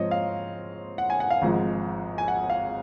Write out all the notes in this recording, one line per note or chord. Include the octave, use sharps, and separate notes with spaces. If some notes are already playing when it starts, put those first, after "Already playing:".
Already playing: G#2 F3 C4 C#5 D#5
F5
F#5
G#5
F#5
F5
G#1 G#2 F3
G#5
F#5
F5